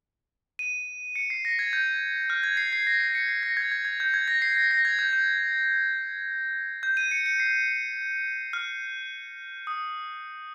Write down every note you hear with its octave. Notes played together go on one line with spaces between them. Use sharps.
D#7
C#7
C7
A#6
G#6
G6
F6
G#6
C7
C7
A#6
C7
C#7
C7
A#6
G#6
G#6
G#6
G6
G#6
A#6
C7
A#6
A#6
G#6
G6
G6
G6
D#7
C#7
C#7
C7
F6
D#6